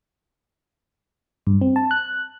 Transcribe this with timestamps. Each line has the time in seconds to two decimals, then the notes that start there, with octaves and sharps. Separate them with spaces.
1.47 G2
1.61 C4
1.76 A5
1.91 F#6